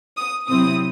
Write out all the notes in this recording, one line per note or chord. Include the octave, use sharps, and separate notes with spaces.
D#6
C3 F#3 C4 E4 D#6